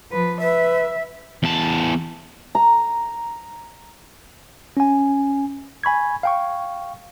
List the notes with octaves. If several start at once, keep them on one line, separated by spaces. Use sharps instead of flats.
F3 B4
B4 E5
E2 A5
A#5
C#4 G#5
G#5 B5 C#6 G#6
F5 G5 C#6